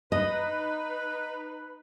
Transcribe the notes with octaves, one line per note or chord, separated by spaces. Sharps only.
D#4 B4 D#5